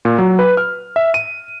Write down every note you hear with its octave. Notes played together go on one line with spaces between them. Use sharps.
A#2
F#3
B4
F6
E5
D#7